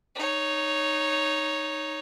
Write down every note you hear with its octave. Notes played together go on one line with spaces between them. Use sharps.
D#4 C#5